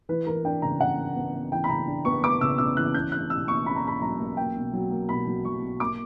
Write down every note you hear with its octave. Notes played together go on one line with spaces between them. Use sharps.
E3 B4
E3 A#4
D4 G5
C#3 A#5
C#3 F#5
B3
B3
B3
E3 G5
B5
C#3 A#5
D4
B3 C#6
B3 D6
C#3 E6
C#3 E6
E3 F#6
C#4 G6
C#4 F#6
B2 E6
A#3 C#6
C#4 B5
A#5
B2 B5
F#3 A#5
A#3
A#3 G5
B2
F#3
A#3
B2 B5
F#3
F#3 C#6
B2
A#3 D6